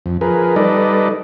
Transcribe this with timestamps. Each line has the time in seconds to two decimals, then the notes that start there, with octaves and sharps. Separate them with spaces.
0.06 F2
0.21 F3 G#4 A#4 B4
0.56 G3 D#4 A4 B4 D5 D#5